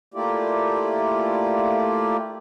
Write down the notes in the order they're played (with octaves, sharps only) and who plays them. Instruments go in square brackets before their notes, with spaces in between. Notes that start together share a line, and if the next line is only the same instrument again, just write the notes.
[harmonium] A3 A#3 E4 F4 G4 D5